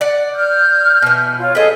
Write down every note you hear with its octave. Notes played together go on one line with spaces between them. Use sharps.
D5 F#5
F6 G6
B2 E3
F4 C#5
G#4 A4 B4 D#5